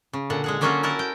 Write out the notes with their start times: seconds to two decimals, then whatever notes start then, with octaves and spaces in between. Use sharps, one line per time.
0.13 C#3
0.30 A#2 D3 F#5
0.44 G#3 G#4 F#5
0.61 D3 F#3 A#3 C#4 F4 F#4
0.83 E4 F#4 A#4 F#5 A5
0.99 G5